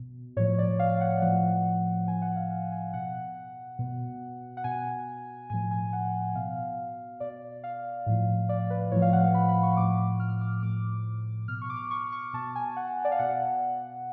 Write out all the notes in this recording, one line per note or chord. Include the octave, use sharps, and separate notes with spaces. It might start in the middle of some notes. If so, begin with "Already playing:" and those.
Already playing: B2
A2 F3 C#5
D5
F5
F#5
A2 F3 F#5
A2 F3 G#5
F#5
F5
F#5
G#5
B2 F#5
B2
F#5
B2 G#5
A2 F3 G#5
G#5
F#5
B2 F5
F5
B2 D5
F5
A2 F3
D5
B4
A2 F3 C#5
F5
F#5
F5
B5
B5
C#6
A2 F3 D6
F6
D6
A2 F3 D6
B2 F6
C#6
D6
C#6
C#6
B2 A5
G#5
F#5
D5
F5
B2 F#5